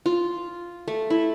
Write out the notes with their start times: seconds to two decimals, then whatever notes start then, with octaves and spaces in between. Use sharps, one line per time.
0.06 F4
0.88 A3
1.10 E4